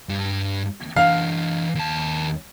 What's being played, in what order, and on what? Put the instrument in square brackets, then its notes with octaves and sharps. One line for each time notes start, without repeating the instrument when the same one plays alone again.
[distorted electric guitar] G2 G3
[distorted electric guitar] E3 D4 [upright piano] F5
[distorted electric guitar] D#2 A5